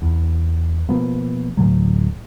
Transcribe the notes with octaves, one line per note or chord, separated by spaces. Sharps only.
E2
B2 F3 A#3 B3
D1 A2 D3 F#3